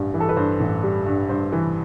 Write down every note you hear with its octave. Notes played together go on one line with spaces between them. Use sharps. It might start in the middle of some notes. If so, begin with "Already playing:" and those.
Already playing: A1 G2 G3
E3
A4
B4
G2 C5
A1
G3
G2
G2 C5
E3